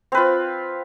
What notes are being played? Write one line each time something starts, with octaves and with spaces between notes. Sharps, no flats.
C4 F4 B4